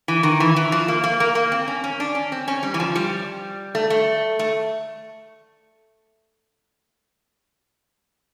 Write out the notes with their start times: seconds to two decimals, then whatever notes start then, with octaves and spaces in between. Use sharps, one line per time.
0.08 E3
0.23 D#3
0.40 E3
0.56 E3
0.72 F3
0.88 A#3
1.04 A#3
1.20 A#3
1.35 A#3
1.52 C4
1.68 C#4
1.84 C#4
2.00 D4
2.15 C#4
2.32 C4
2.48 C#4
2.63 G3
2.74 E3
2.80 F3
2.96 G3
3.75 A3
3.90 A3
4.39 A3